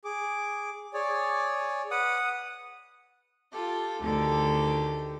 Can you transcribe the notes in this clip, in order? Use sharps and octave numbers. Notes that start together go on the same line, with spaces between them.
G#4 D6
G#4 C#5 D5
B4 F#5 D#6
F4 G4 A4
D2 D3 D#3 G4 A4